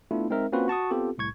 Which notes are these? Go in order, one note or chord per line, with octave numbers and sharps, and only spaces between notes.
A3 B3 D4 E4 F4
G#3 C4 D#4 A#4 E5
A#3 C4 C#4 F4 F#4 B4
F#4 A5 C#6 D#6
B3 C4 F4 G4 A4
C2 A2 C#6 G#6